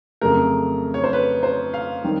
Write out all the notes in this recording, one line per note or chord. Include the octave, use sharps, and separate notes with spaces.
F2 C#3 F#3 A3 A#4
C#5
C5
B4
C5
F5
D#3 G3